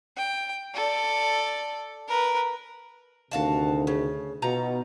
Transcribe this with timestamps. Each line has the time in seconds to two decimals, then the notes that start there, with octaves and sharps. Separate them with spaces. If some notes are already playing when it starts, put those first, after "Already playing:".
0.17 G5
0.74 A4 D5
2.08 A#4 B4
3.31 D2 C3 D#3 F#4 F5 A5
3.87 C#3
4.42 B2 D#4 F4 A#5